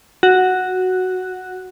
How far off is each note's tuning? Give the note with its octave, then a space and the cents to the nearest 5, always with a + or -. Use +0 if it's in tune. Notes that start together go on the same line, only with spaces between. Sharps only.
F#4 +0